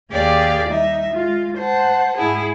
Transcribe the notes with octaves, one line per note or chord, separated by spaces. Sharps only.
D#2 G4 G#4 D5 F5
G3 D#4 E5
G#3 F4
C5 F#5 A5
G#2 E4 G#4